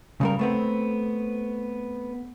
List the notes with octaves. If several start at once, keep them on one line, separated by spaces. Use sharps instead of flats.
C#3 G3 A#4
A3 B3 C4